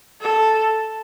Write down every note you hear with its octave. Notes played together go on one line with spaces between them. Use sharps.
A4